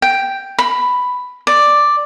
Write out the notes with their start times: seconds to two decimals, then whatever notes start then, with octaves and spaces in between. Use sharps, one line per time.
0.02 G5
0.58 B5
1.47 D5